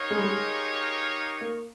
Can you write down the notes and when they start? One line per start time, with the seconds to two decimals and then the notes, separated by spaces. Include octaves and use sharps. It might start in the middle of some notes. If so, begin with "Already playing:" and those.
Already playing: D#4 G4 A#4 C#5 F5
0.11 G#3
0.18 G3
0.24 G#3
1.41 A#3